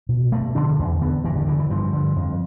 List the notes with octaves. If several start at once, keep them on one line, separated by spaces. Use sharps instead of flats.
B2
G2 A3
D3 D4
E2
D3 B3
G2 E3
D3
D3 E3
E3
G2 F3
D3
F2